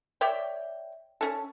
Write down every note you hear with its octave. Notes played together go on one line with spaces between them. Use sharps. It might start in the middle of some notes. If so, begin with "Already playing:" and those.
C#5 D5 E5 G5
C#4 A4